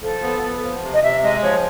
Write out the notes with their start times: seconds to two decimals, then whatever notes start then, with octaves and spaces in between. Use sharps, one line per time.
0.03 F3 A4
0.22 B3
0.42 B3
0.63 F3
0.83 C3
0.94 D#5
1.03 C3 E5
1.23 G#3 D#5
1.43 F3 C#5